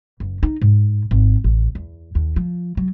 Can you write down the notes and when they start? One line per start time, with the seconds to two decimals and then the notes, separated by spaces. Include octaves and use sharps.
0.20 F#1
0.43 D#4
0.62 G#2
1.11 G#1
1.44 A1
1.75 E2
2.15 D#2
2.36 F3
2.77 F#3